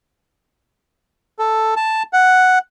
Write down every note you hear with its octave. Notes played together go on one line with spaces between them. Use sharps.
A4
A5
F#5